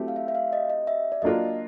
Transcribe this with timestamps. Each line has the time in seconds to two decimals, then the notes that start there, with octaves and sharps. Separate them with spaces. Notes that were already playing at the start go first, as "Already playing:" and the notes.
Already playing: F#3 A3 C4 E4 G4
0.08 F5
0.16 E5
0.28 E5
0.35 F5
0.53 D#5
0.69 D#5
0.87 E5
1.12 D5
1.22 F#3 A#3 D4 F4 A#4 D#5